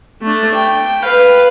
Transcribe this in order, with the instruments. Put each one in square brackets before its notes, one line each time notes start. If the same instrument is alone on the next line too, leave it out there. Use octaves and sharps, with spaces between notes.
[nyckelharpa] A3 D4
G5
B4 F5